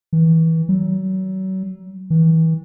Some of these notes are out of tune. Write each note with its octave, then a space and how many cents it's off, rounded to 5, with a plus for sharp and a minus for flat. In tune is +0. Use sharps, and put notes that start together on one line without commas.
E3 -25
F#3 +35
E3 -30